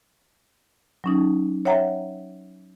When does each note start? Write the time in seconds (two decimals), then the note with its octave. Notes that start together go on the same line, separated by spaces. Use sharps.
1.04 F#3 C#4 D#4
1.65 C#5 E5 F#5 G5 A#5